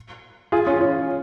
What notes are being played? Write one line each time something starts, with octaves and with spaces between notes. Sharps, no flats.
F4 G#4
C#4 F4
C#4 F4